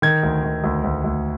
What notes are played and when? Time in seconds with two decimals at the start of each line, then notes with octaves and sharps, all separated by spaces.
0.02 D#3 G#6
0.23 D2
0.44 D#3
0.64 D2
0.84 D2
1.04 D2